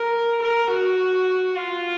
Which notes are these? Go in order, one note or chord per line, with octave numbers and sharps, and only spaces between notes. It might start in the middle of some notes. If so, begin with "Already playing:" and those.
Already playing: A#4
A#4
F#4
F4